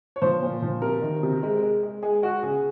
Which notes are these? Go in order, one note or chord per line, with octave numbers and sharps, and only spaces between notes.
C#5
F3 C5
A#2
F3
C3 A#4
D#3
C3
G#3
G#3
G#3
G#3 G#4
G#3 F#4
C#3 G#4